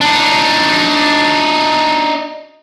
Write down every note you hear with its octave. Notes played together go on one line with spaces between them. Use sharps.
D4 D#4